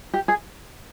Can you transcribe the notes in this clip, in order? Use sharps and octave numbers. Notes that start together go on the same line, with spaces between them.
G4
G#4